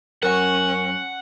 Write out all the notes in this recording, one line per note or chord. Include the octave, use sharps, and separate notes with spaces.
F#2 C#4 F#4 A#4 F#5 F#6